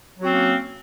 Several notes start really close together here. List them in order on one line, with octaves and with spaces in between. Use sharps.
F#3 F#4 C4 C#4 A#3